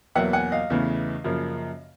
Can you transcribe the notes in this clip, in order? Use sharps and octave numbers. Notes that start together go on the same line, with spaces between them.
E2 B2 F#3 A#3 E5 F#5
F#5 G#5
D#5 F5
E2 C#3 E3 A3
F#2 C#3 F3 A#3